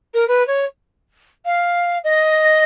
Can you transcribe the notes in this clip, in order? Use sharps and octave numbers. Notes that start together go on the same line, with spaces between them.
A#4
B4
C#5
F5
D#5